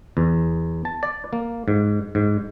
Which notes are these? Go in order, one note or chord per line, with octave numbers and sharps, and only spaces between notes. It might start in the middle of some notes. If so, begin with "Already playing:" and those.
E2
A5
D5
A#3
G#2
G#2